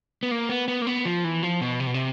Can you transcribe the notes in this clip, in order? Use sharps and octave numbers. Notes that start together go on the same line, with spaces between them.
B3
A#3
B3
B3
A#3
B3
F3
E3
F3
B2
C3
B2
C3